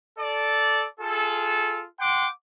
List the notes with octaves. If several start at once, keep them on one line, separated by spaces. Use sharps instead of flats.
A4 D5
F4 G#4 A4
F#5 G5 C6 D6